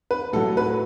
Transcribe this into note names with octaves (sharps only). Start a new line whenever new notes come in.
B4
A2 F#3 A4
B4